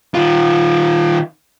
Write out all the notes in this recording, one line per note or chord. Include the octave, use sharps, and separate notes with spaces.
D#3 F4